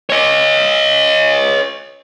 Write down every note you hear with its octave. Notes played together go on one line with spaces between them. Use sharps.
C#5 D#5